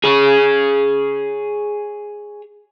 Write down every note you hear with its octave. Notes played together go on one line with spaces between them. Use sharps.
G#4 C#5